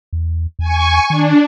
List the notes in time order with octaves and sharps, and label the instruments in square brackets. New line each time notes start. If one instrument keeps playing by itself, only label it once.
[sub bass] E2
[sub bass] E2 [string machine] G#5 C#6
[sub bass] D#3 [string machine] D4